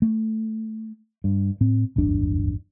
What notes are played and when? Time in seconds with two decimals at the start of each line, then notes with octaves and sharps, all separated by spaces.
0.02 A3
1.24 G2
1.61 A2 C4
1.96 D1 G1 E2 D4